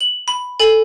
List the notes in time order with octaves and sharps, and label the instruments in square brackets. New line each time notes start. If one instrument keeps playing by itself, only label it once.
[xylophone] F#7
B5
A4 G#5